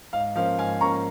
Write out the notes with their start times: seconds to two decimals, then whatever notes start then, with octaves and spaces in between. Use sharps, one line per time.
0.13 G#2 F5
0.36 F3 A#3 C#4 F5
0.58 G#2 F5 G#5
0.81 F3 A#3 C#4 A#5 C#6